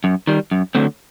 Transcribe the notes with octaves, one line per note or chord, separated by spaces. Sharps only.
F#2
D#3 G3
F#2
D3 F#3 A3 C4